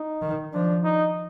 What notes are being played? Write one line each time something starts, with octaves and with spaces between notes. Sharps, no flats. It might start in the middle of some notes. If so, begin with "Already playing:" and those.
Already playing: D#4
D#3
F3 D4
D#4